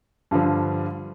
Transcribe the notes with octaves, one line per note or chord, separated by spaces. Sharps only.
G2 D3 F3 F4